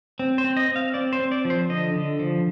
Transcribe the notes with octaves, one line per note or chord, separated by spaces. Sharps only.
C4
C5
C4
D#5
C4
F5
C4 D5
C5
C4
D5
F3
C5
D3 D#5
D3
F3